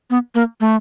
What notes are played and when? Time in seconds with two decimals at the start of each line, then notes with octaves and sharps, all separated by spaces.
0.10 B3
0.35 A#3
0.61 A3